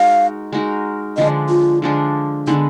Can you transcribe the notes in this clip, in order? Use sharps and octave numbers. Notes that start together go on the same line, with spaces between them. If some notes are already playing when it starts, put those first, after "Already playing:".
Already playing: G#3 D#4 F#4 A#4 F5
G#3 D#4 F#4 A#4
D3 F3 G#3 D4 D#5
F4
D3 F3 G#3 D4
D3 G#3 B3 D#4